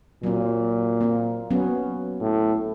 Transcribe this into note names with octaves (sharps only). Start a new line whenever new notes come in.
A#2 F#3 C4
A#3 C4
F#3 B3 C#4
A2